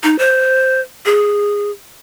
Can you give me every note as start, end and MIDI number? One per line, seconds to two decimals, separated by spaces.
0.04 0.16 63
0.19 0.81 72
1.06 1.71 68